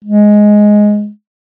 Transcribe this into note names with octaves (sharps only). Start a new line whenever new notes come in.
G#3